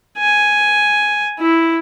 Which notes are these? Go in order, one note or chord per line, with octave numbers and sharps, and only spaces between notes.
G#5
E4